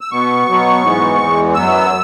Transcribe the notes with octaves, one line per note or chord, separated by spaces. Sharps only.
E6
B2 B3 C#6
B2 F#3 B3
G#2 E3 G#3 B3
E2 E3 G#3
F#2 F#3 B3 E6